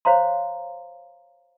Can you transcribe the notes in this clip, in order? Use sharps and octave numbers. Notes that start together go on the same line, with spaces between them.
C5 C#5 F5 A#5 C6